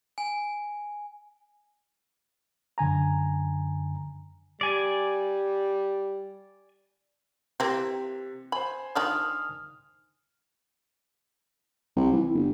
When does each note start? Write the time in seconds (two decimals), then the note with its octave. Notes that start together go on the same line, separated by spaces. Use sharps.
0.18 G#5
2.78 F#2 D3 G#5 A#5
4.61 G3 D5 G#5
7.60 C3 E3 A#3 C4
8.52 C5 G#5 B5
8.95 D#3 D4 F4 D#6 F6
11.96 C2
12.13 E3
12.34 G1